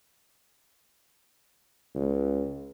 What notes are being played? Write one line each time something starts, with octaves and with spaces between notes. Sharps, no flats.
C#2